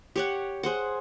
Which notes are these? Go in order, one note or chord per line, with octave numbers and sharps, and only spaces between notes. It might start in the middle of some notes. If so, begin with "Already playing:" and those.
G4 C#5 F#5
G#4 C5 F#5